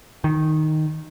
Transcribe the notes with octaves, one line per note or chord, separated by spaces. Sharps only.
D#3